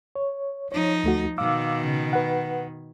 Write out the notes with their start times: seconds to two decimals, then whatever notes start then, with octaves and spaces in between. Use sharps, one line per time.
0.16 C#5
0.72 F3 D#4 C#5
1.04 D2 A3 F#4
1.38 B2 D#3 F5 D6 E6
1.84 C#3
2.13 B4 F#5